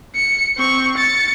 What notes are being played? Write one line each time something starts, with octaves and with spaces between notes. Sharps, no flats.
C#7
C4 C#6
A6 C#7